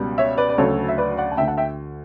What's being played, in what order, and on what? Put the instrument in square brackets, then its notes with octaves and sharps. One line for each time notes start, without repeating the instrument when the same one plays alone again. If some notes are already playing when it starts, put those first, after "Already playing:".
Already playing: [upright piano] C#2 B2 G3
C#5 E5
B4 D5
D5
D2 C#3 F#3 A4 C#5
E5
B4 D5
D5 F#5
A5
D2 D3 A3 E5 G5
F#5 A5
E5 G5